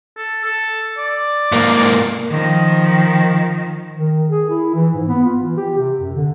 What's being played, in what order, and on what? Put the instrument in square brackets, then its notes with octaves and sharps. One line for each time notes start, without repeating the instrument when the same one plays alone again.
[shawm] A4
A4
D5
[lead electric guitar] G#2 A#3
[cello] D#3 F3
[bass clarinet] D#3
G#4
E4
E3
G#2
B3
F4
E3
G4
C3
F#2
D3